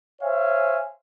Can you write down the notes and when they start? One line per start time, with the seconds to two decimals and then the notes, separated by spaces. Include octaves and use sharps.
0.21 C5 C#5 E5 F5 G#5